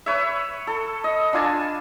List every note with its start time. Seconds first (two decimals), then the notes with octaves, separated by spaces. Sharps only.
0.06 B4 C#5 E5
0.67 A4
1.04 D#5
1.33 D4 F4 G#5 A5